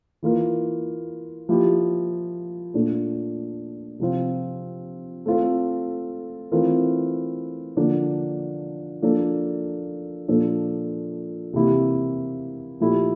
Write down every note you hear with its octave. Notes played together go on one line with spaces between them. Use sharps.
E3 A#3 F4 A#4
F3 A#3 E4 G4
A#2 A3 D4
C3 F3 C4 F4
A3 C4 F4 A4
E3 A3 C4 F4 A#4
D3 F3 A#3 D4
F3 A#3 D4 A4
A#2 F3 A#3 D4 A4
C3 E3 A#3 E4 G4
A#2 F3 A3 E4 G4